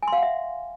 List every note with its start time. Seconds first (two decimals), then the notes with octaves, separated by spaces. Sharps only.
0.03 G#5
0.08 C6
0.13 F5
0.18 F#5
0.23 E5